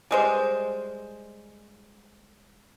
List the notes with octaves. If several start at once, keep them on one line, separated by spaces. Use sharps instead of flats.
G3 G#3 C5